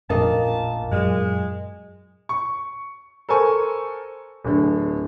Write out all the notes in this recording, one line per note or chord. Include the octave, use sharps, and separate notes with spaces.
A1 F2 A#2 A#3 D4 D#5 A5
F#2 F#3 G#3
C#6
A4 A#4 C5 G#5 C#6
D1 D3